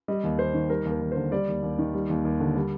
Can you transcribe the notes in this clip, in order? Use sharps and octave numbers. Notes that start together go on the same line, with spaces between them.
G3 D#5
D#2
D#2 C5
D#3
G3 A#4
D#2
A#4
D#2
D3 C5
G3 D5
D#2
D#2
D#3
G3
D#2
D#2
D3
G3